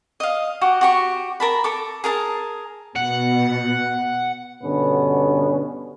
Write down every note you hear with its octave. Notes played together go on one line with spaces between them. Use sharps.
D#5 F5
F#4 G4 D6
F#4 G4 C#6
A#4 A5 B5
A4 D6
G#4 A#4 A5
B2 F#5
G2 B2 D3 B3 C#4